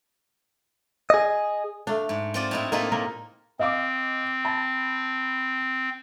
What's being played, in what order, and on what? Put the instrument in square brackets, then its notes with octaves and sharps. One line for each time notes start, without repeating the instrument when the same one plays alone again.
[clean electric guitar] G#4 D#5
[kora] A3 D4 [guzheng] F5
[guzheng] G#2
C4 F4 D5
A2 D#4 E4
[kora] A#3 G#4 D5 [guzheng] D#4 F4 E5
[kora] A#3 A#4
[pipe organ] C4 [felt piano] D#5 F5 D6
[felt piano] A5 B5